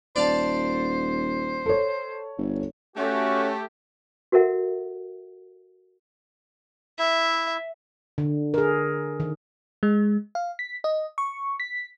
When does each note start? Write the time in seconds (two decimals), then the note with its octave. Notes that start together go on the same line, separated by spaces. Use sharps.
0.16 D#1 C5 D5 F5 A5
1.66 A4 C#5
2.38 G1
2.97 A3 C#4 F#4 G4
4.32 F#4 A4 A#4 E5 F#5
6.99 E4 E5
8.18 D3
8.54 G#4 A#4
9.20 D#3
9.83 G#3
10.35 F5
10.59 B6
10.84 D#5
11.18 C#6
11.60 B6